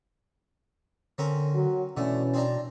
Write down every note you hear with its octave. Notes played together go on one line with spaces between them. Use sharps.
D3 C4 C#4 A#4
F#3
B2 D3 E3 A3 C#4
C4 D4 A#5